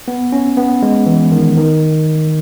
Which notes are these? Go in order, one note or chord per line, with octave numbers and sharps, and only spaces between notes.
B3
C#4
B3
G#3
E3
D#3
D#3